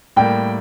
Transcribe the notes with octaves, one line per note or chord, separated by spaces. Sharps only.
A2 G3 A#3 G5